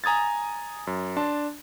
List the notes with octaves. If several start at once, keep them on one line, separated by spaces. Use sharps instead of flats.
G#5 A#5 D#6 G#6 A6
F#2
D4 A5 C6